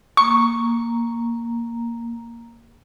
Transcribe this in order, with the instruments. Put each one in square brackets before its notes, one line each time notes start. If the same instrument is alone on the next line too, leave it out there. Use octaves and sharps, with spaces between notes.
[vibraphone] A#3 A#5 [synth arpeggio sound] C#6